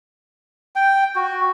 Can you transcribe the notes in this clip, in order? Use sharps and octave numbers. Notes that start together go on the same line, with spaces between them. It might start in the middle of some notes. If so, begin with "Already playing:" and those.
G5
F#4